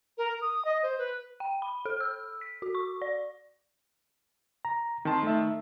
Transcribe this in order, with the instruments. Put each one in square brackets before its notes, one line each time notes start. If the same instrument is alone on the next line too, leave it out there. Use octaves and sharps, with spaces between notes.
[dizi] A#4
D#6
D#5
C5
B4
[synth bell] G5
B5
A4
E6
B6
F#4
C#6
D5
[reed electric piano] A#5
[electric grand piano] D#3 A5 [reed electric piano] C4 C6
[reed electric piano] A3 D#4 E5